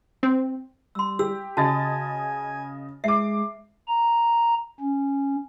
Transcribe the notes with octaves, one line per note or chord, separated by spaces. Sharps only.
C4
G3 C6 E6
G4 E6
C#3 F#4 D#5 G#5 A5 A6
G#3 E5 D6 C7
A#5
C#4